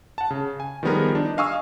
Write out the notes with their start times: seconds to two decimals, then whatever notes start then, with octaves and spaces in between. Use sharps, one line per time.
0.18 F#5 A5
0.30 C#3
0.60 G#5
0.83 D#3 F3 G3 B3 G#4 A#4
1.15 D4 D#4
1.37 D#5 F5 G#5 C#6 D#6 E6